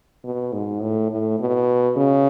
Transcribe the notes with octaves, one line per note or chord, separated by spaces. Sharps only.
B2
G#2
A2
A2
B2
C#3